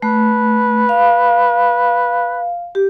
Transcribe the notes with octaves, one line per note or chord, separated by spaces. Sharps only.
A3 B4
F5
G4